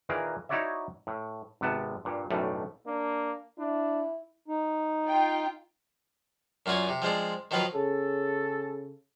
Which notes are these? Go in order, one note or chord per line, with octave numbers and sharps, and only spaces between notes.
A#2 D#3 E3 G#4 A#4
D#4 E4 F#4 C#5 D5 E5
A2
G#1 C3 B3 A5
G2 A#2
B1 F#2 A2 G3 A3
A#3 D4
D4 E4
D#4
F4 G5
F#2 A#2 F4 F#4 G#5 D#6
C3
F3 G#3 C4 D4
D#3 F3 F#3 F4 B4
C#3 A4